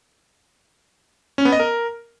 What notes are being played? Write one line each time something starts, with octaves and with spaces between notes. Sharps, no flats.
C#4
B3
D#5
A#4